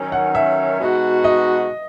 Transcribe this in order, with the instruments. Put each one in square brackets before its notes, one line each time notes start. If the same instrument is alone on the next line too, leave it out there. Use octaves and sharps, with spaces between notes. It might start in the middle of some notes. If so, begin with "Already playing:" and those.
Already playing: [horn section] D#3 F#3 C#4
[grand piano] F#5
E5
[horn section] B2 G#3 D#4 F#4
[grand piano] D#5